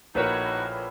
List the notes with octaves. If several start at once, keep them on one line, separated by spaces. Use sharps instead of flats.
A#1 A2 D#4 F#4 A#4 B4 C#5